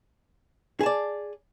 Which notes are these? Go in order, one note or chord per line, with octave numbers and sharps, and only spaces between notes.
G#4 D5 A5